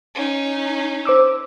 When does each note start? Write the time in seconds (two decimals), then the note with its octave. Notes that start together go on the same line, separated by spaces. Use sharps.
0.16 C#4 D#4
1.05 C5 D6 E6